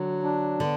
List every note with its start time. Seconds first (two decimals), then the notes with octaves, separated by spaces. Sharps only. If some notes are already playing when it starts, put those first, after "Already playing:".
Already playing: D3 F#3
0.23 D4
0.60 D3 B3